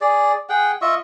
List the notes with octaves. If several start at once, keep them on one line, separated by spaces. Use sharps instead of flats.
G#4 D5
G#4 F#5 G5
F4 D#5 E5 C#6